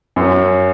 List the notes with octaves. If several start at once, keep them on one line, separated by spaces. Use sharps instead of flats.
F#2